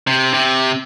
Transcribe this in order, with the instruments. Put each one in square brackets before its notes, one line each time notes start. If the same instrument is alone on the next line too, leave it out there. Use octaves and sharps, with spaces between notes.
[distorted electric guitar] C3
C3